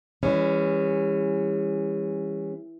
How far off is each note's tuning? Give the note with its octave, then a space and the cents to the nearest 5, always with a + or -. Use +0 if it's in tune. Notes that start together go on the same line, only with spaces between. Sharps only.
E3 +0 G3 +45 C#4 -10